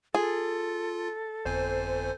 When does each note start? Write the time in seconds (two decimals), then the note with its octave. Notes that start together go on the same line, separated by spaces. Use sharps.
0.15 F4 G#4 A4
1.45 G1 F2 C5 G#5